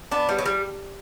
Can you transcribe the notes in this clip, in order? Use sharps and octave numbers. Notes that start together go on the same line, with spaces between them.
B3 D4
G3 B3
F#3
G3